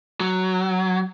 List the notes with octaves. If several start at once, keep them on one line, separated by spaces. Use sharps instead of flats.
F#3